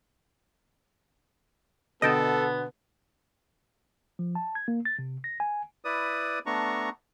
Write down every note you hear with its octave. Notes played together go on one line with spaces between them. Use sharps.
B2 D3 B3 A4 D#5 G5 A5
F3
A5
G#6
A#3
A6
C3
A#6
G#5
E4 B4 D5 D#6
A3 B3 D4 A#5 C#6